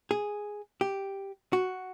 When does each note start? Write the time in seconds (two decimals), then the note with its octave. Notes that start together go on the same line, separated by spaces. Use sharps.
0.11 G#4
0.81 G4
1.53 F#4